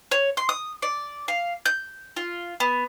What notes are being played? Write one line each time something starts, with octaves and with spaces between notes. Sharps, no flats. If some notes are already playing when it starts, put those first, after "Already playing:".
C#5
C6
D#6
D5
F5
G6
F4
B3